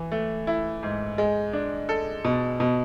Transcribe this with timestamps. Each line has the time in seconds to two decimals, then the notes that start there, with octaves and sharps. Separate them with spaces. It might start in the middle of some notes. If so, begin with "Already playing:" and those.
Already playing: E3
0.12 A3
0.47 E4
0.83 G#2
1.18 G#3
1.53 D4
1.89 A4
2.25 B2
2.60 B2